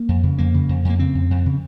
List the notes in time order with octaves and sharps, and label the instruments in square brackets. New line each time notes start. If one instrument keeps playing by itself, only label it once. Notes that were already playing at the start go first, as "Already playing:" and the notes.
Already playing: [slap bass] A#3
F2
C#3
F2 A#3
C#3
F2
F2 A#3
C#3 C4
F2
F2
C#3